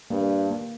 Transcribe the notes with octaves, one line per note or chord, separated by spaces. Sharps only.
G2 A#3
A#3